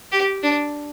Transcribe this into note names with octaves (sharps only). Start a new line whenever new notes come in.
G4
D4